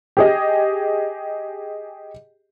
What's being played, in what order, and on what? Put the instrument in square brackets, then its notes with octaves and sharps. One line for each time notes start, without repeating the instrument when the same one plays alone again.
[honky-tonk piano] G4 G#4 D#5